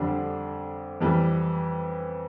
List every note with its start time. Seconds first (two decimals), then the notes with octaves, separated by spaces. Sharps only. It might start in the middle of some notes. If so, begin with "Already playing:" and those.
Already playing: F2 D3 G3 D4
1.00 F2 E3 G3